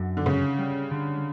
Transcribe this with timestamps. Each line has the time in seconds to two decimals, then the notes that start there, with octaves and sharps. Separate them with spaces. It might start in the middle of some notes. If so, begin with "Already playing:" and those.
Already playing: F#2 D3
0.17 D3
0.26 C#3 C#4
0.59 G3
0.91 D3